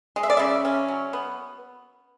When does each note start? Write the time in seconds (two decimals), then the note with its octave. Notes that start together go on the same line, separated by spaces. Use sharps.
0.16 G#3
0.23 E5
0.30 D5
0.37 C#3 E5
0.65 C#4
0.88 F#3
1.13 B3